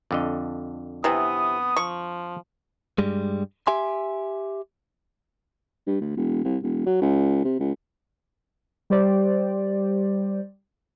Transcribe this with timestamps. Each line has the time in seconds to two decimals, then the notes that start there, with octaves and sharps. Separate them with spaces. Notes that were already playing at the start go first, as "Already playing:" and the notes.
0.11 F2 D3 D#5
1.04 C3 E3 B3 D#6
1.76 F3 C#6
2.98 G2 G3 G#3
3.67 G4 E5 G#5 C6
5.87 G2
6.01 D2
6.17 E1
6.45 C2
6.63 E1
6.86 F#3
7.01 C#2
7.44 C3
7.60 C#2
8.90 G3 G4 C5 D5